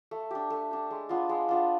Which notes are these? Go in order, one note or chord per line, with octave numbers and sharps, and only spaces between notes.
A3
D4 G4
A3
D4 G4
G#3
B3 D4 F4
G#3
B3 D4 F4